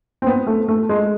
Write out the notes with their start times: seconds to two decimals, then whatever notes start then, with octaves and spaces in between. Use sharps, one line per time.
0.22 C4
0.27 B3
0.47 A3
0.68 A3
0.89 G#3